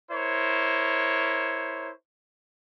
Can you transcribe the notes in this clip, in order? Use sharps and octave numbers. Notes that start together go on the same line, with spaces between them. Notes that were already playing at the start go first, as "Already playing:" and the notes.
E4 A#4 C5 C#5